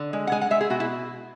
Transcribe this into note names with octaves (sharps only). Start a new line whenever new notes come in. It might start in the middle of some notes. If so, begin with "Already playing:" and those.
Already playing: D3
G#3
F#5
G#3 G#5
F#5
G#3 E5
G#4
B2 F#4
E4